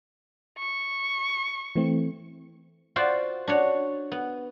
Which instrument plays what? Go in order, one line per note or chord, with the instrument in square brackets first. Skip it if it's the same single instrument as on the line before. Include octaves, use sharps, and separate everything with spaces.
[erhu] C#6
[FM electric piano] E3 A3 C4
[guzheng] F4 F#4 C5 D5
D4 F#4 C#5
B3